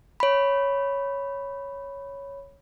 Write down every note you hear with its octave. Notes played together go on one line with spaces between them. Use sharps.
C#5 B5